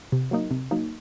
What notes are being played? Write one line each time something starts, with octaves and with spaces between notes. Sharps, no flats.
C3
F#3 A#3 D#4
C3
F#3 A#3 D#4